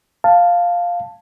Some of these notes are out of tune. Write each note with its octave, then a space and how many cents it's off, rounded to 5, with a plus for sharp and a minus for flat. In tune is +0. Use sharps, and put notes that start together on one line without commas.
F5 +0 A5 +5